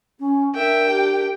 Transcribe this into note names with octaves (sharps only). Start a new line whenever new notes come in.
C#4
D4 A#4 E5 G5
G4